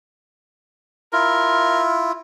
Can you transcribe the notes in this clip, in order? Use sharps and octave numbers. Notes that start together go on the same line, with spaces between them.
E4 F4 A#4